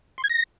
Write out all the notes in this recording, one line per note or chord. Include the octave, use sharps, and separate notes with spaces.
C6
G#6
A#6